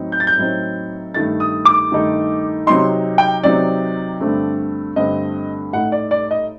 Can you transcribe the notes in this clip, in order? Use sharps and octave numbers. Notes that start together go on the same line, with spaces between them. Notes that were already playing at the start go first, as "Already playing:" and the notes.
Already playing: A2 F#3 C4 D#4
G6
A6
G6
A2 F#3 C4 D#4
G2 D#3 A3 D#4 A6
D#6
D6
G2 D#3 A3 D#4
C3 F#3 C4 D#4 C6
G5
C3 F#3 C4 D#4 D5
G2 D3 A3 C4
G2 D3 A3 C4 D#5
A2 A3 D#4 F#5
D5
D5
D#5